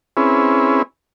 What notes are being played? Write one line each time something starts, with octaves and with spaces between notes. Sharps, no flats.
C4 C#4 E4 G#4 B4